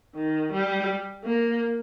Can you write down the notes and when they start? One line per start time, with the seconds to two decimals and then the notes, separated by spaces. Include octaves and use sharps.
0.16 D#3
0.53 G3
1.24 A#3